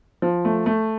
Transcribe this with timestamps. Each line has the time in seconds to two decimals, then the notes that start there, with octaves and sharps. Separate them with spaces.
0.22 F3
0.45 A3
0.66 A3